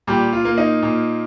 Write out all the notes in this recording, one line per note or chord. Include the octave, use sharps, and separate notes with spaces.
A#2 G3 G4
F4
A#3
D#4
A#2